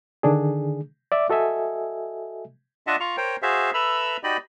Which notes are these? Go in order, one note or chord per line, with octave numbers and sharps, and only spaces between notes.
D3 D#3 D4 G#4
D5 E5 D6
F#4 A4 D#5 E5 G#5
D4 F4 D#5 E5 F#5 A5
F4 F5 A#5 C#6
A#4 C5 C#5 G5
F#4 G#4 C5 E5 F5
A4 B4 E5 A#5 B5 E6
D#4 F#4 G4 D5 D#5 B5